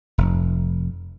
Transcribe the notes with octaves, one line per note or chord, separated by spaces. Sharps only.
F1